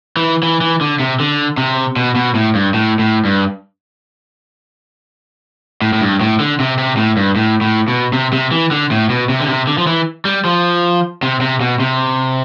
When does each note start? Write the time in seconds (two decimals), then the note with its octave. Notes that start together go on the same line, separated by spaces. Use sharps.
0.17 E3
0.43 E3
0.61 E3
0.81 D3
1.00 C3
1.20 D3
1.58 C3
1.96 B2
2.16 B2
2.35 A2
2.55 G2
2.74 A2
2.99 A2
3.25 G2
5.82 A2
5.93 A2
6.02 G2
6.21 A2
6.40 D3
6.60 C3
6.78 C3
6.97 A2
7.17 G2
7.36 A2
7.62 A2
7.88 B2
8.13 C3
8.33 C3
8.51 E3
8.71 D3
8.91 A2
9.10 B2
9.29 C3
9.40 D3
9.48 C3
9.67 D3
9.78 F3
9.87 E3
10.25 G3
10.45 F3
11.23 C3
11.41 C3
11.61 B2
11.80 C3